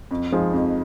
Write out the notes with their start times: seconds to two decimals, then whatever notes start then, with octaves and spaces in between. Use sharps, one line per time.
0.11 F2
0.32 F3 G#3 D#4
0.53 F2